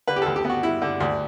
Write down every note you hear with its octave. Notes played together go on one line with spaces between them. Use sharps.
D3 B4
G4
D2 A4
G4
B3 F#4
G3 E4
D3
D2